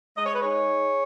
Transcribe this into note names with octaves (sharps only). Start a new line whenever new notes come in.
G#3 D#5
C#5
B4
D#4 G#4 C#5